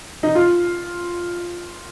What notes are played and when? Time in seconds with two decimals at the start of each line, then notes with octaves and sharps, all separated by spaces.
0.23 D#4
0.35 F4